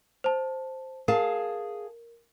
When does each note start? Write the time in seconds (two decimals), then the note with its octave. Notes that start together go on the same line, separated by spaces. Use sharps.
0.24 C5 A5
1.08 G#4 A#4 F5 A5